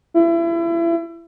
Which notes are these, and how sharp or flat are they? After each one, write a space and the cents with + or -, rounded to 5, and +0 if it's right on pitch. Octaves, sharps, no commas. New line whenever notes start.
E4 +30